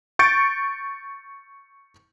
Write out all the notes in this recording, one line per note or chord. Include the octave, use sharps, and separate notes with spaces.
C#6 G6 A6 C#7 D7